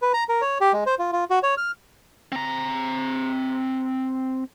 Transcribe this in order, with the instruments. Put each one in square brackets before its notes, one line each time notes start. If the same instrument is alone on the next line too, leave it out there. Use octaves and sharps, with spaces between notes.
[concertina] B4
A#5
A#4
C#5
G4
G#3
C5
F4
F4
F#4
C#5
F6
[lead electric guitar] C4 A#5